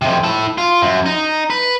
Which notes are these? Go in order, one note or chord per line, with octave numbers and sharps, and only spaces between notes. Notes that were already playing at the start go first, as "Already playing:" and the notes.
F2 C3
E4 A5
F4
F#2
D#4
B4